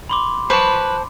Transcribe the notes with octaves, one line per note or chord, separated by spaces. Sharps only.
B5 C6 D6
B4 C5 A5 C#6